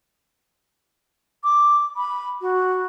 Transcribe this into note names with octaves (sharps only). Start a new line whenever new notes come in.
D6
B5
F#4